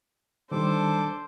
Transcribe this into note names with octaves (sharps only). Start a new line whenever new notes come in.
D#3 G3 D4 A4 C5 D6